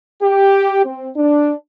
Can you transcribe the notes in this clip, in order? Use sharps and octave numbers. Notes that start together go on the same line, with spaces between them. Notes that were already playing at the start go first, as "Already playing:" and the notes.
G4
C4
D4